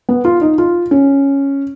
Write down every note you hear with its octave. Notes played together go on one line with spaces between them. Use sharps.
B3
F4
D#4
F4
C#4